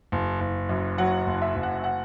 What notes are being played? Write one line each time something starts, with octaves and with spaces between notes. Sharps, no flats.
F#1
F#1
F#2
F#3 F#5
F#1
E5
F#1
F#5
F#5